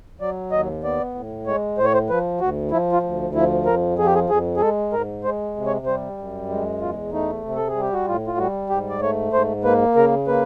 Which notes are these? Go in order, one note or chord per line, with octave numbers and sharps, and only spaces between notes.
F#3 D5
D#2 D#5
B3 D5
A2
G#3 C#5
A2 C5
C#5
C5
F3 B4
D2 F#4
F3 E4
F4
D2
F3 E4
F2 A#4
F3 G#4
G4
G#4
F2 G#4
G#4
G#3 A4
G#2 A#4
G#3 C5
C3
C#5
G3 C5
F#2
G#3
E2 F4
A3 D#4
C3
A4
G#4
G3
G4
F#4
A2 F4
F4
G3 F#4
G#2 G4
D5
A3 C#5
G#2 C5
A#3 B4
C#3 A#4
A#3 B4